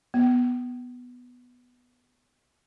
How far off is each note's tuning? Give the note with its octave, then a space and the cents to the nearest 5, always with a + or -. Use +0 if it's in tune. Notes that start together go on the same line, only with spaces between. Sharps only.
B3 +0